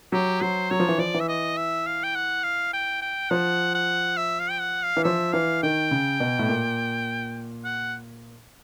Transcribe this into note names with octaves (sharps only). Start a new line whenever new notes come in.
F#3 G4
F#3 C5
F#3 C#5
F3
E3
F3 D5
E3
E5
D#5
E5
F5
G5
F#5
F5
G5
G5
F3 F#5
F#5
E5
F5
G5
F#5
F5
E3
F3 E5
E3 F5
D#3 G5
C#3
B2
A2
A#2
F#5